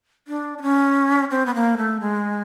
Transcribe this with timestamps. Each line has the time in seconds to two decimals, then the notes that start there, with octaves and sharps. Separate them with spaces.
0.28 D4
0.58 D4
0.62 C#4
1.31 C4
1.46 B3
1.55 A#3
1.77 A3
2.00 G#3